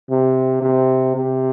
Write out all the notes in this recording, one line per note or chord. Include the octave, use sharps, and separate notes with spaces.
C3
C3
C3